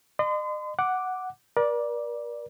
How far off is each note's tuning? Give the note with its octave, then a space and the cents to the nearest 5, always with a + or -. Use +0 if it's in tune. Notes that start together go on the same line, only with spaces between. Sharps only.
D#5 -40 C6 -40
F#5 +0 D6 +0
A#4 +40 D5 +0